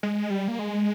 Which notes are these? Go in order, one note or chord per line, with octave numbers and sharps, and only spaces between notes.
G#3
G3
A#3
G#3